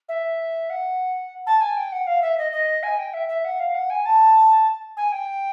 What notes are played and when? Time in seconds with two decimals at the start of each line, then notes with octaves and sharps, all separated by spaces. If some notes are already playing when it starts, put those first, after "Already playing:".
0.09 E5
0.70 F#5
1.46 A5
1.61 G#5
1.77 G5
1.92 F#5
2.07 F5
2.22 E5
2.38 D#5
2.52 D#5
2.83 G#5
2.99 G5
3.14 E5
3.28 E5
3.45 F#5
3.60 F5
3.75 F#5
3.90 G#5
4.06 A5
4.97 G#5
5.12 G5